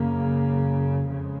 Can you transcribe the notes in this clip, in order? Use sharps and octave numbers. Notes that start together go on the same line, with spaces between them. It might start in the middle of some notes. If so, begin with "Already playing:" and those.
Already playing: F#2 C#3 A#3
F2 C#3 G#3